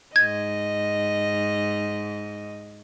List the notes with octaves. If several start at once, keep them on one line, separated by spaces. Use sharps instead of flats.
G#2 D#5 G#6